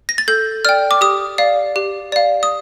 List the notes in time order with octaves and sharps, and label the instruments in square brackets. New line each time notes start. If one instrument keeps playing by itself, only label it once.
[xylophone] A#6
A6
A4 G6
D5 G5 F6
D6
G4 D#6
D5 F5
G4
D5 F5
D#6